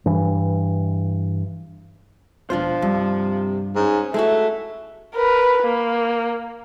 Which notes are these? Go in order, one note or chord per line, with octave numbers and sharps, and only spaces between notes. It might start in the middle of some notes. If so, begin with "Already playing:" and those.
G2 E3
E1 F3 D4 F4 C5
G2 C3 G3
G#2 C#4
G#3 A3 E4 F#4 E5
A#4 B4
A#3